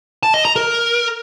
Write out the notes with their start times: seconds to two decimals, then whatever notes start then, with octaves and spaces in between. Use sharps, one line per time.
0.23 A5
0.34 D#5
0.45 A#5
0.56 A#4